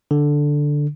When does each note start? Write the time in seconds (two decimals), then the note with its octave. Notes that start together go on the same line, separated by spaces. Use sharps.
0.11 D3